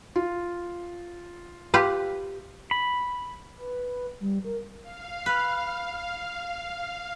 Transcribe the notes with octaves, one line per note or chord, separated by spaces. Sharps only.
F4
F4 G4 B4
B5
B4
G3
A#4
F5
B4